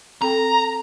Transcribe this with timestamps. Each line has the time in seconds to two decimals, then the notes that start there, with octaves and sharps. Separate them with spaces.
0.22 C4 A4 G5 A#5